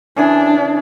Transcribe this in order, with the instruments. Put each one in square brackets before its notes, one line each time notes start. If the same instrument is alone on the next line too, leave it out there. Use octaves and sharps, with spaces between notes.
[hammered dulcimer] C#3 E3 G#4 [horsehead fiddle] D4